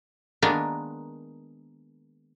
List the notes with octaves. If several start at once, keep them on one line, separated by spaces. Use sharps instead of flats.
D#3 G#3 A#3 B3 D4